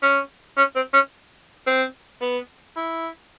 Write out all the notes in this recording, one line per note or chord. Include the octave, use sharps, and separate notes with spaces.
C#4
C#4
C4
C#4
C4
B3
E4